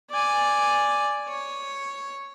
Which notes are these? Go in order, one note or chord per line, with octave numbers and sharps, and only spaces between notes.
D5 G#5
C#5